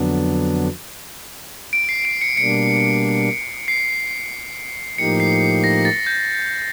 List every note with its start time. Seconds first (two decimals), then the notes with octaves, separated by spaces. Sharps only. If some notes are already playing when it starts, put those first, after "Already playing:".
Already playing: F2 D3 F#3 B3 D4
1.73 D7
1.89 C7
2.05 D7
2.21 C#7
2.37 B2 G3 A#3 D4 C#7
3.68 C7
4.98 A2 F3 A#3 D#4 G4 C#7
5.20 C7
5.64 A#6
5.85 A6
6.06 G6